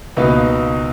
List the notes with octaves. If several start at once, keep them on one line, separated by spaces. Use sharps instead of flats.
C#2 B2 A#3 D#4 B4